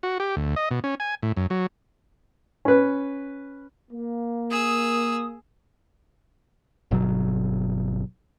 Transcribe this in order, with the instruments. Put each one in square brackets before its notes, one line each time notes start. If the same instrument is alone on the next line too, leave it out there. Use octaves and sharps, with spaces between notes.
[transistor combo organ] F#4
G4
D2
D#5
B2
C#4
G#5
A2
F#2
F#3
[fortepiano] C#4 B4
[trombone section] A#3
[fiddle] G#4 E6 [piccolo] D#6
[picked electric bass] G1 B2 F#3